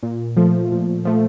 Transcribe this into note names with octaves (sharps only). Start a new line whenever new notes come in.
A#2
F3 A3
A#2
F3 A3